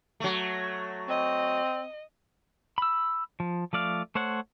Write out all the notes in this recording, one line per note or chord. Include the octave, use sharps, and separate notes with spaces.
F#3 A3
C4 D#5
B5 E6
F3
F3 A3 D5 F5
A3 C5 C#5 F#5